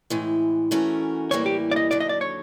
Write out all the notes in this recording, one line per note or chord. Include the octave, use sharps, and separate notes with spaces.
A2 E3 G#3
E3 A3 C#4 F#4 A#4
A2 E3 G3 A#3 C#5
G4
D5
D#5
D#2 D3 F#3 D5
D#5
D5
C#5